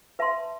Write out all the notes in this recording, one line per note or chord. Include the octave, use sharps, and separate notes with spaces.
B4 E5 A5 C6